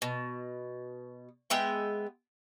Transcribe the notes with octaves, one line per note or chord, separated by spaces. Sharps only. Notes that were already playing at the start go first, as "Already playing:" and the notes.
B2
G#3 B3 E5 G5